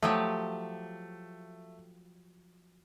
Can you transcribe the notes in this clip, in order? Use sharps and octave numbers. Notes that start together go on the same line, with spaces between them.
F3 F#3 A3 G4